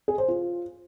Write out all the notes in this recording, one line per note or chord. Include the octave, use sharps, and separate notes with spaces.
G#4
C5
F4